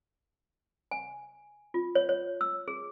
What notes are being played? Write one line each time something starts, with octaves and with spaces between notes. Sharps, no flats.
G#5
F4
C#5
C#5
E6
G#4